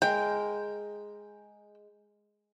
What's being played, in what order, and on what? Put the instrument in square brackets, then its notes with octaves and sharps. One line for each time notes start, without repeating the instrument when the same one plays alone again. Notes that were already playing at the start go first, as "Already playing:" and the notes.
[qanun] G#3 A#4 [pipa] G5